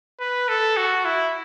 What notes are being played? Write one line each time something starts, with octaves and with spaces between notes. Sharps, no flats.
B4
A4
F#4
E4